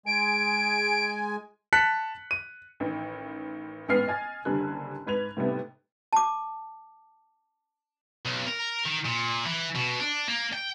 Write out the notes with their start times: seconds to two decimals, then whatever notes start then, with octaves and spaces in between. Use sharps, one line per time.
0.06 G#3 G#5 D7
1.73 A5 F#6 B6 C#7
2.31 D#7
2.80 A1 D#3
3.88 A1 G#2 B3 F6 C7
4.08 D#5 G#5 G#6 A6
4.45 F#1 D3 G3 G#5 F#6
5.06 G#2 B4 G#6 F7
5.37 A2 C3 G3 A3 B3 D#4
6.13 A5 D6
8.25 B1
8.46 A#4
8.85 D#3
9.05 A#2
9.46 E3
9.75 B2
10.00 D4
10.28 A#3
10.53 G5